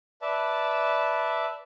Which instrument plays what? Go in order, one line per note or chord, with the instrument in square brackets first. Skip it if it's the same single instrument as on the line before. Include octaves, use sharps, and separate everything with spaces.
[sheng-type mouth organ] B4 D5 E5 A5